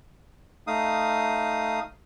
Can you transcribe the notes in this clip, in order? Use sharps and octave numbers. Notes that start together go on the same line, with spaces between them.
A3 D#4 F5 D#6